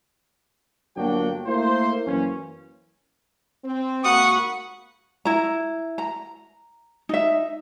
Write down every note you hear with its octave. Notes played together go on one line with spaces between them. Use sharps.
G1 F#3 A#3 D4 F#4 G5
A3 A#3 E4 C5
F#2 E3 A#3 C#4
C4
G#2 A#3 F#4 F#5 B5 C#6 D#6
E4 A#5
A#5
D#4 E5